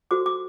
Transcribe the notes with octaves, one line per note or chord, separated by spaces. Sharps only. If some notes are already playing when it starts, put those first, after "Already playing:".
F#4 A4 C5 D6
D6